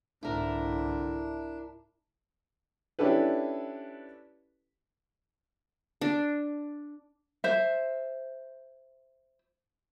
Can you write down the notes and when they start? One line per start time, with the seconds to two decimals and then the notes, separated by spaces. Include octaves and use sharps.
0.23 C2 G#2 D3 D4 E4 A#4
2.99 C#4 D4 E4 G4 A4 B4
6.01 D4
7.44 C5 E5